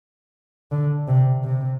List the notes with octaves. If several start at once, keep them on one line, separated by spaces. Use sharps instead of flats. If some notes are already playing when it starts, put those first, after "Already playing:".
D3
C3
C3